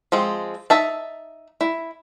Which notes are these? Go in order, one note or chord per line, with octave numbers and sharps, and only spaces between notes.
F3 G#3 C4
D#4 E5 A5
E4